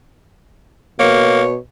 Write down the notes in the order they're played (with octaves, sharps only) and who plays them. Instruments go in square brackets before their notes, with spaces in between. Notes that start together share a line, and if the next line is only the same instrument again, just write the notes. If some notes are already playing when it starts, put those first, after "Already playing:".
[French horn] B2 [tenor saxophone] A#3 [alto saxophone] C#5